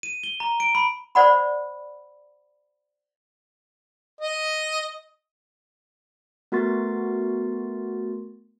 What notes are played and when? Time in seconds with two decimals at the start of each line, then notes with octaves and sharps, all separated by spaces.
0.03 D#7
0.24 G7
0.40 A#5
0.60 D7
0.75 B5
1.15 C5 D5 F#5 B5
4.21 D#5
6.52 A3 B3 F#4 A#4 C6 A6